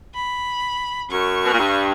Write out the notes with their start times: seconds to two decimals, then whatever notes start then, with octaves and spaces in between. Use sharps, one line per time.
0.14 B5
1.10 F#2 C#6
1.44 B2
1.52 A#2
1.58 G2